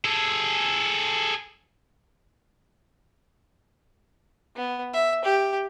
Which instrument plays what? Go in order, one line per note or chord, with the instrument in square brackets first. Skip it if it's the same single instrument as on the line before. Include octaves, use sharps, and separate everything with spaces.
[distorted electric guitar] G#4 A4
[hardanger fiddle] B3
E5
G4